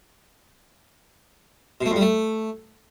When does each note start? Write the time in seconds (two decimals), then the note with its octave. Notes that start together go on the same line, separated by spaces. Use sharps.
1.81 B2
1.86 A3
1.91 F2
1.96 G3
2.01 A3